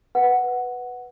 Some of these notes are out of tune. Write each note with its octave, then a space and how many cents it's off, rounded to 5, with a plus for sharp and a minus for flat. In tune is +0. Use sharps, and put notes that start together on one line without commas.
B4 +0 F#5 +0